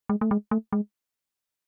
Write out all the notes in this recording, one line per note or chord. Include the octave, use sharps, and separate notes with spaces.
G#3
A3
G#3
A3
G#3